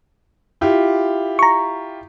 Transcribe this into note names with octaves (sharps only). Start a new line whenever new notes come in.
E4 F4 G4
A#5 C#6